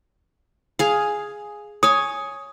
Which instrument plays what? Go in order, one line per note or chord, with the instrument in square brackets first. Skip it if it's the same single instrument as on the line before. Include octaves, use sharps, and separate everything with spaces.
[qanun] G#4 F5
[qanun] C#5 G#5 [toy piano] D#6